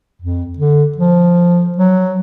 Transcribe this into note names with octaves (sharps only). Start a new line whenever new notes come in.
F2
D3
F3
F#3